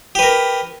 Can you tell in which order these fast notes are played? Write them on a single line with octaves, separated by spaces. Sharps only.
G4 B4 A#4